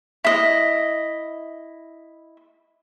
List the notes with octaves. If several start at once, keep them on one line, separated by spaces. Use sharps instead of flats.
E4 D#5